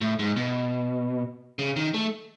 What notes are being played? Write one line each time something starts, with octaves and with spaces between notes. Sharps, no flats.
A2
G#2
B2
C#3
D#3
A3